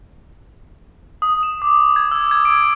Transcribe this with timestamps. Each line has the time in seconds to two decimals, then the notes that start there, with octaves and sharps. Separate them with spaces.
1.22 D#6
1.43 E7
1.62 D6
1.96 G#6
2.12 E6
2.31 G#6
2.45 D7